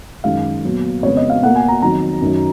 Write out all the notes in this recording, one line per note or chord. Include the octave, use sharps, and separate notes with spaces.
F#2 D#3 G#3 F5
A#2 F#3 B3
F2 C#3 G#3 B3 C#5
D#5
F5
B2 A#3 F#5
G#5
A#5
F2 D#3 F#3 A#5
F#2 D#3 F#3